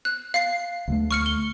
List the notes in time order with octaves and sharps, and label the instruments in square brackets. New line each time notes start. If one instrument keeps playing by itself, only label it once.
[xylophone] F#6
F5 C7
[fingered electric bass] D2 F#3 A3
[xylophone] C#6 F6 C#7
G7